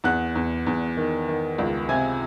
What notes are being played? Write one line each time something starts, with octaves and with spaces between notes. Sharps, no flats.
E2 F#5 F#6
E2
E2
D#3
D#3
C#2
C3 G#5 G#6